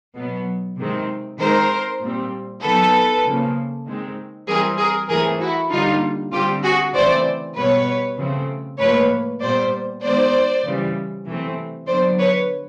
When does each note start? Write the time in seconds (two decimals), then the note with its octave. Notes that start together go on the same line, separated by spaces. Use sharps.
0.15 B2 F#3 B3
0.77 C3 D#3 G#3 C4
1.38 D#3 G#3 C4 A#4 C5
2.01 A#2 G3 C4
2.62 D#3 F#3 B3 A4 B4
3.24 C#3 F3 A#3
3.86 D#3 G#3 C4
4.47 E3 G3 C4 G#4 A#4
4.78 G#4 A#4
5.09 E3 A3 C4 G#4 A#4
5.40 E4 F#4
5.70 D3 G3 A#3 D#4 F4
6.32 D3 G3 C4 F4 G4
6.64 F#4 G#4
6.94 C#3 E3 A3 C4 C5 D5
7.56 B2 G3 B3 B4 C#5
8.17 C#3 F3 A3 C4
8.79 A2 F3 A#3 B4 C#5
9.40 A#2 G3 B3 C5 D5
10.02 D#3 G#3 B3 C5 D5
10.64 C#3 E3 G3
11.26 C3 E3 A3 C4
11.88 D3 F#3 B3 C5 D5
12.19 B4 C#5